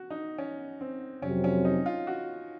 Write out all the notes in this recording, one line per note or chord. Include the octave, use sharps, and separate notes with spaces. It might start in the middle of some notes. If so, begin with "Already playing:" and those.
Already playing: F#4
D#4
C#4
C4
F2 C3 F#3 C4 C#4
C#4
D#4
F4
F#4